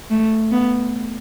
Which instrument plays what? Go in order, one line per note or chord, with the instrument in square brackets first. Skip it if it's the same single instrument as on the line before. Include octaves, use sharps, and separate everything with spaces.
[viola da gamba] A3
B3